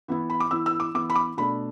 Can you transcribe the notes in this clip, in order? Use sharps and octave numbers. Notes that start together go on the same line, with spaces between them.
E3 B3 E4
B5
D6
E3 B3 E4 E6
E6
D6
E3 B3 E4 D6
B5
D6
B2 A3 D4 B5